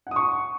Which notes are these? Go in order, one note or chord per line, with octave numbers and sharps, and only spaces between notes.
F#5 C#6 D#6